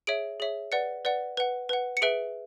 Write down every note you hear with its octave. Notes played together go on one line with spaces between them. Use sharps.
G#4 C#5 E5 D7
G#4 C#5 E5
B4 D5 F#5 C#7
B4 D5 F#5
B4 F#5
B4 F#5
C#7
G#4 B4 E5 D7